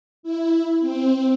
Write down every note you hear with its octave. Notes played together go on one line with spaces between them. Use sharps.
E4
C4